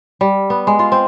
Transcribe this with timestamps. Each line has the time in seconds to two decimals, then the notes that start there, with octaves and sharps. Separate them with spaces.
0.21 G3
0.50 B3
0.67 G#3
0.79 F4
0.92 C4